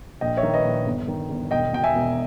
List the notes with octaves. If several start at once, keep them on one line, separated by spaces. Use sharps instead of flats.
A#1 D#5 G5
C#5 E5
D#3
B4 D#5
A#1
G1
D#3
G1
E1 D#5 G5
B2 G5
E5 G#5
E1